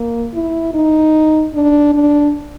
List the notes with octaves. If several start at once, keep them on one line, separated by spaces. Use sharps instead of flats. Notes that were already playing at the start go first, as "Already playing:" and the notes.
Already playing: A#3
E4
D#4
D4
D4